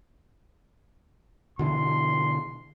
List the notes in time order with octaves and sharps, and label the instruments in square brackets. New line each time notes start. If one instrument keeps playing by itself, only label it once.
[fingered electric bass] B2 D3 E3 [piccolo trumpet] C6